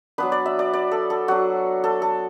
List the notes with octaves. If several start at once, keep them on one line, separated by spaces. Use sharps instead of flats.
F#3 B3 D4 B4
D5
E5
D5
D5
A4
A4
F#3 D4 F#4
A4
A4